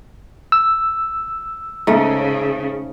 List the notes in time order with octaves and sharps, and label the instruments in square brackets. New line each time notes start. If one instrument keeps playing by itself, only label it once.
[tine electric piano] E6
[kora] G#2 A3 [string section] C#3